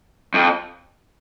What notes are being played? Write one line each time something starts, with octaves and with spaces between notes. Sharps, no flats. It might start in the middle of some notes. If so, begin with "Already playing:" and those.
F2